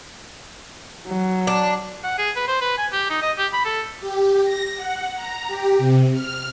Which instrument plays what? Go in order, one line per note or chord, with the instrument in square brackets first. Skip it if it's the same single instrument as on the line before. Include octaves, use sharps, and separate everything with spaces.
[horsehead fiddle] F#3
[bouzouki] D4
[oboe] F#5
G#4
B4
C5
B4
G#5
G4
D#4
D#5
G4
B5
A4
[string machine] G4
A#6
F#5
A#5
G4
C3
F6